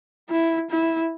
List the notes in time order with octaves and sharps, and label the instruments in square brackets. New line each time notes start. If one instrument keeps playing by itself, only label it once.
[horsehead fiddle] E4
E4